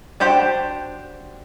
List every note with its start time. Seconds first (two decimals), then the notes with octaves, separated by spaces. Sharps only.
0.20 D4 F#4 G4 C5 G5